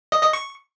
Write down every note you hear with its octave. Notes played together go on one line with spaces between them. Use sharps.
D#5
D#5
C#6